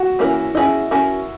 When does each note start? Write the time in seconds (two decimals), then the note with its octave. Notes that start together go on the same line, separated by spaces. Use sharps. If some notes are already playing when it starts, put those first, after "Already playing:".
Already playing: F#4
0.19 E3 A#3 C#4 E4 A#4
0.55 C#4 E4 G#4 D#5
0.91 C#4 F#4 A#4